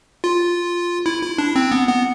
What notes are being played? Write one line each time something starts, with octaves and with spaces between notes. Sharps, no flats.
F4
E4
E4
D4
C4
B3
B3